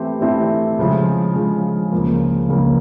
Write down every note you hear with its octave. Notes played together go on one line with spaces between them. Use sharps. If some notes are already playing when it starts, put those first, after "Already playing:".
Already playing: E3 A3 C4 E4 G4
E3 A3 C4 E4 G4
C#3 F3 G#3
C#3 F3 G#3
C#2 C#3 F3 A#3
C#2 C#3 F3 A#3